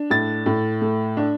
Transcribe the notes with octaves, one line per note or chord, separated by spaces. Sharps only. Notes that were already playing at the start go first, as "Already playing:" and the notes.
Already playing: D4
A2 A6
A2
A3
D4